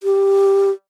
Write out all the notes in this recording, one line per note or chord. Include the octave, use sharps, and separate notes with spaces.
G4